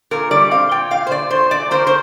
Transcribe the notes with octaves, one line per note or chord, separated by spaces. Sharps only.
A#2 A#4
G3 D5
C4 F5
A#2 G5
A#2 F5
C5
A#2 D5
A#2 C5
A#2 D5
A#3 C5
C5